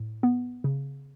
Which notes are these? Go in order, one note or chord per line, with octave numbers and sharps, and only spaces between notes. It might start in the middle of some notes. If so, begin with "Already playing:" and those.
Already playing: A2
B3
C#3